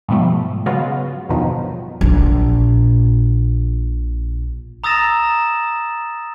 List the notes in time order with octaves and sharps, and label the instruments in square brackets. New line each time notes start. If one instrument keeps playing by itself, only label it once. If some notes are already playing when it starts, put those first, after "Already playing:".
[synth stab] G#2 B2 F3 G3 A3
C#3 F#3 G#3 B3 F4 F#4
E2 G2 B2 D#3 F3 F#3
[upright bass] A#1 A#2
[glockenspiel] A#5 D#6 E6 A6 A#6 E7